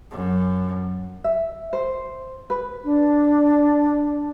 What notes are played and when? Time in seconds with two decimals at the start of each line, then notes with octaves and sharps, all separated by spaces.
0.11 F#2
1.24 E5
1.73 C5
2.50 B4
2.84 D4